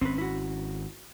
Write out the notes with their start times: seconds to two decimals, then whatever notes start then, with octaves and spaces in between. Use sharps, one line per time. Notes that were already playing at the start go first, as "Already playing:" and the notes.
0.01 G#1 C4 C#4 B4
0.18 E4 F#4